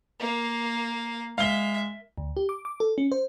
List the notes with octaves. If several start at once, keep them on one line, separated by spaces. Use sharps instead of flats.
A#3 F5
G#3 E5 F5 G7
D2
G4
D6
D6
A4
C#4
C5